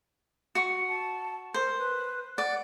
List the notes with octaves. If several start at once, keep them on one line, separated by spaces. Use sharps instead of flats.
F#4 C#6
A5
A#4 C5
B4
D5 F#5